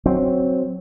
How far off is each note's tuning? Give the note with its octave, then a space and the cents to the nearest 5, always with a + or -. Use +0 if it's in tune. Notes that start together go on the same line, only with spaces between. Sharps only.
F#3 +0 C4 +0